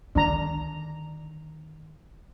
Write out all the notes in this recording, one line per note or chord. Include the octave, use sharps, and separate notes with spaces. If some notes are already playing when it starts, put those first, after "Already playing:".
D3 D#3 D4 A#5